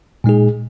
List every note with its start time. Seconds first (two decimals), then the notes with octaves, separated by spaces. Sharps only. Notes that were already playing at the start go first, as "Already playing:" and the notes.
0.24 A#2 G#3 D#4 G#4